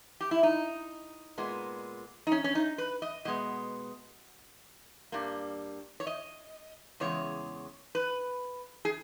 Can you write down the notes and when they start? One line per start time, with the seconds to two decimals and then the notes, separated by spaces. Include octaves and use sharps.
0.21 G4
0.31 E4
0.43 D#4
1.38 A#2 G#3 B3
2.27 D#4
2.32 C#4
2.44 C#4
2.55 D#4
2.78 B4
3.02 D#5
3.25 B2 G#3 B3 D#5
5.12 G2 G3 A#3
6.00 C#5
6.07 D#5
7.00 E2 C#3 G#3 C#5
7.95 B4
8.85 G#4